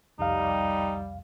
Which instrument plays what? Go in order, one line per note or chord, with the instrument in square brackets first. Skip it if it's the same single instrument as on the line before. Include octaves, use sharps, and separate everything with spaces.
[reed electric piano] C2 F2 F5 [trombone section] G3 [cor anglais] D#4